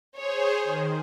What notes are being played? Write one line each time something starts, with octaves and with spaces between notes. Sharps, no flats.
G#4 C5 C#5
D#3